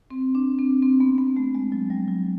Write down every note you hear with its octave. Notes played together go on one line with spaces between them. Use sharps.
C4
D4
C4
C4
B3
B3
A3
G#3
F#3
G3
F#3